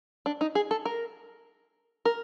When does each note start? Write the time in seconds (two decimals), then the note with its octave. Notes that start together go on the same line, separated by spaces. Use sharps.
0.26 D4
0.41 D#4
0.55 G#4
0.71 A4
0.85 A#4
2.05 A#4